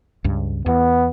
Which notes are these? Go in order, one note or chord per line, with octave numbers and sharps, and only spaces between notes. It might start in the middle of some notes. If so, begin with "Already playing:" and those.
C#2 G2
E2 B3